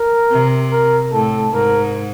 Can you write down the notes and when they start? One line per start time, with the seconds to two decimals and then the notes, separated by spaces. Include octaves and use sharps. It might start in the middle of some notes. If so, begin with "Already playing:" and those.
Already playing: A#4
0.31 C3
0.72 A#4
1.13 A2 A4
1.53 G#2 A#4